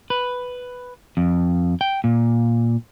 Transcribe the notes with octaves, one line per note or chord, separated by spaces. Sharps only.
B4
F2
G5
A#2